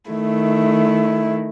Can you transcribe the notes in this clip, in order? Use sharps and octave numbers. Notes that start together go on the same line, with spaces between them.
D#3 A3 E4